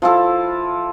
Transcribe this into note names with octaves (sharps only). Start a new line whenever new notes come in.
F3 E4 A4